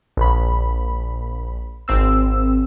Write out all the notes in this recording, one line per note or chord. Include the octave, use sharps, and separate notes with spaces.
A#1 B5
G#1 C4 E6